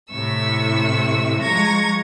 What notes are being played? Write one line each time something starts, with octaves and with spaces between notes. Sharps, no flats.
A2 C3 E4 C#6 E6
F3 G#3 A#5 C#6 G#6 A#6